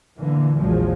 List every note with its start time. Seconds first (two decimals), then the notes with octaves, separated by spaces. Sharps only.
0.17 A#2 D3 E3 A#3
0.57 A#1 E2 A#2 F3 F#3 G#3